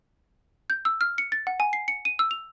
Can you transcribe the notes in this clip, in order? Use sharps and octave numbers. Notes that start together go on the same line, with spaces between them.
G6
E6
F6
C#7
A6
F#5
G#5
C7
C#7
D#7
E6
F7